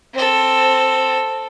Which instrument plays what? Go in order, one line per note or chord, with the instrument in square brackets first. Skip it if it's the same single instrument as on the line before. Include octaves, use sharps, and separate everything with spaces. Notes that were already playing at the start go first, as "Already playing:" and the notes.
[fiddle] C4 A4